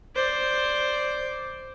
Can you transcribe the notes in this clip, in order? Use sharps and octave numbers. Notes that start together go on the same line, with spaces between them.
C5 D5